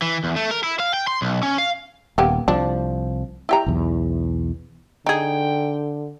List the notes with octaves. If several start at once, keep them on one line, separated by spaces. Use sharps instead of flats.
E3
E2
A3
A#4
E4
F5
G5
C6
B1
C#4
F5
D#1 A#3 B3 G4
C2 F3 D4
E4 G4 A#5
B1 E2
D3 D#4 G#4 G5